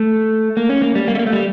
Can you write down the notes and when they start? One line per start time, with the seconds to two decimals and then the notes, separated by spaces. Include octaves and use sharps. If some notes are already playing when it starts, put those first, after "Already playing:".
Already playing: A3
0.57 A#3
0.69 C#4
0.82 A#3
0.95 G3
1.08 A#3
1.15 A3
1.19 A#3
1.27 A3
1.33 G3